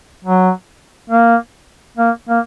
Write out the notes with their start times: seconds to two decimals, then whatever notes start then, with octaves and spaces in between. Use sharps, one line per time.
0.24 F#3
1.10 A#3
1.97 A#3
2.28 A#3